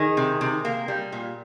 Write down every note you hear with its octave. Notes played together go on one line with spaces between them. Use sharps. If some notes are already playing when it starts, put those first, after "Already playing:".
Already playing: D#3 G#4
C3
C3
A#3
G3
A#2